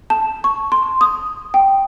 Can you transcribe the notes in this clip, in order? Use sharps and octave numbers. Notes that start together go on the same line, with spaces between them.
A5
C#6
C6
D#6
G5